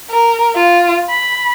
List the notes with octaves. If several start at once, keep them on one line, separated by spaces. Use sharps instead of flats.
A#4
F4
B5